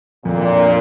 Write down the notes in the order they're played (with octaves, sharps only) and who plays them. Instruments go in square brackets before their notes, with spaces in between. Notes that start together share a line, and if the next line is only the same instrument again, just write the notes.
[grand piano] F2 [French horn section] A#2
[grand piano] D4
A#3